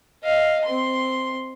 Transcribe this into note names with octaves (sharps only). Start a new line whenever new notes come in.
D#5 F5
C4 C6